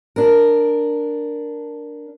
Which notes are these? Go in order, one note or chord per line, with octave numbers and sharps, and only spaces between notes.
D4 A#4